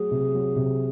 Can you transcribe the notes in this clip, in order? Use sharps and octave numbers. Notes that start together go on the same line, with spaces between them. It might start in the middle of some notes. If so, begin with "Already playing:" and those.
Already playing: F#3 A3 G#4
C3
F#3
C3